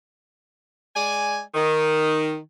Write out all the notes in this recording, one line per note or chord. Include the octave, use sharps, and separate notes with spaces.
G#3 D5 G#5
D#3